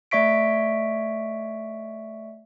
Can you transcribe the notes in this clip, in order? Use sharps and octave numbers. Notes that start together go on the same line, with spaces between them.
A3 D5 E5 C#6 B6 D7